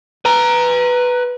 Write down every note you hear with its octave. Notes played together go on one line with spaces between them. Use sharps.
B4 A#5